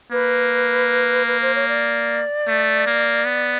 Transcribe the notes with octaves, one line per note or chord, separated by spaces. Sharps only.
A#3 B4
B4
C5
C#5
D5
A3
A#3
B3